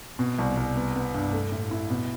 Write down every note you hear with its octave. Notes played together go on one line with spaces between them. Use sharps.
B2
C2
C2
B3
B3
G2
A3
A2
E4
B2